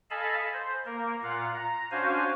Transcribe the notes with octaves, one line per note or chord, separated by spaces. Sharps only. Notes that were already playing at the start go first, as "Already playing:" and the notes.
A4 D#5 F5 G#5 A5 B5
C5
A#3 A#4
A#2 F4 F5 F#5
A#5
C#4 D4 F#4 C5 F5 G#5